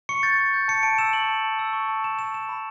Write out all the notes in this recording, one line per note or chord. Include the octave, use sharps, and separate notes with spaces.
C#6 C#7
G6 A6
C#6
G6
A5 C#7
A5 D7
E6 E7
C#6 F#7
A5
A5
E6
C#6
A5
A5 E7
E6 E7
C#6 E7
B5